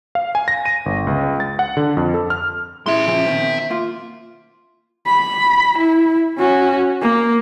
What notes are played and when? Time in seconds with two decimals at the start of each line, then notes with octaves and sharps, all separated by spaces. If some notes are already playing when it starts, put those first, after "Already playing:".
0.15 F5
0.35 G#5
0.48 A#6
0.65 D#7
0.86 G1
1.07 C#2
1.40 A6
1.59 F#5
1.77 D3
1.97 F2
2.14 A4
2.30 F6
2.86 G#3 E4 E5 C6
3.08 C#3 F3 G#4
3.26 B2 D#3 C4
3.70 A#3 F4
5.07 B5
5.78 E4
6.38 C#4 F#4
7.02 A#3